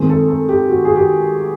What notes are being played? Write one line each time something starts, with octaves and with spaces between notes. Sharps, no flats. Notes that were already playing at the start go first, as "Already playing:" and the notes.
Already playing: D#3 G#3 C4
A4
A4
G4
F#4
G#4
G4